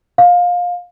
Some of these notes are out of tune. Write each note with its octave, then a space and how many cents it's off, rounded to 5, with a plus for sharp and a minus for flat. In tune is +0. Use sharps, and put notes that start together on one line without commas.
F5 +20